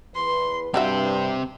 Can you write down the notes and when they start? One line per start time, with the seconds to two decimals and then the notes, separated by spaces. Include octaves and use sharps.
0.15 E2 B4 C6
0.74 G2 G3 C4 F#4 G4 C5 E5